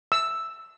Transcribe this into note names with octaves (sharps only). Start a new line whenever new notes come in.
E6